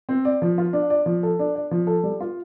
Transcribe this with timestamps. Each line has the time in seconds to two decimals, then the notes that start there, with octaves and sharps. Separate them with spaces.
0.09 C4
0.25 D5
0.42 F3
0.58 F4
0.73 D4
0.90 D5
1.06 F3
1.23 A4
1.39 D4
1.55 D5
1.71 F3
1.87 A4
2.03 G3
2.20 F4